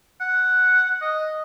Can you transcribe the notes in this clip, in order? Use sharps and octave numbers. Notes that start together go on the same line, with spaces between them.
F#5
D#5